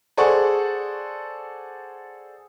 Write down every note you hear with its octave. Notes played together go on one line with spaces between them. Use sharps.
G#4 A4 C5 D5 F#5 C#6